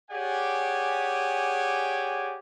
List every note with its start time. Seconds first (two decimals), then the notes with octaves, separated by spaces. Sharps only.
0.11 G4 G#4 C#5 D5 F#5 G#5